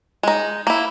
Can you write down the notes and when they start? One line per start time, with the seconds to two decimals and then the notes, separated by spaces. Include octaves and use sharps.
0.23 G#3 D#4
0.67 A#3 E4